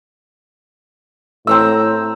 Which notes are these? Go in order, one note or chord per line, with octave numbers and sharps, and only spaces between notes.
A2 C4 A#5 E6